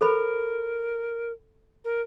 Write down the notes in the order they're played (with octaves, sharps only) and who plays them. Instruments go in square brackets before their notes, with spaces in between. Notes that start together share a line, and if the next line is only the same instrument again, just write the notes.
[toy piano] A4 C5 B5 [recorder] A#4
[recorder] A#4